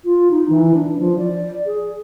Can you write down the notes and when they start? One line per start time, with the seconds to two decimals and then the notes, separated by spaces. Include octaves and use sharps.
0.04 F4
0.31 D#4
0.49 E3
0.74 D4
0.99 F3
1.18 D5
1.66 G#4